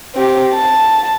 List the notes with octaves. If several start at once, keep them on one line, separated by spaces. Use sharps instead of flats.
C4 G4
A5